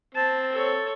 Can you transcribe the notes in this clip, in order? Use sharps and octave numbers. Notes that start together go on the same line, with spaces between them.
C4 A5
A4 C#5